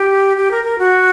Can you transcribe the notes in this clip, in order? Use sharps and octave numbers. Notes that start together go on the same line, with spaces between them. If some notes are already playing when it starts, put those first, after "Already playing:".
Already playing: G4
G4
A#4
A#4
F#4